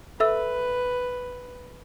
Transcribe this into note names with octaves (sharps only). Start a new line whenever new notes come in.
A4 B4 E5 E6